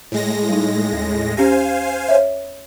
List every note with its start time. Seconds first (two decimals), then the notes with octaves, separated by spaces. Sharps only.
0.12 A2 G#3 A#6
0.49 G3 D#4
0.92 D#2
1.37 C#4 G4 C5 F5 G#5 A#6
2.08 C#5 E5